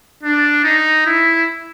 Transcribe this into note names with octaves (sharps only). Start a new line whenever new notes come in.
D4
D#4
E4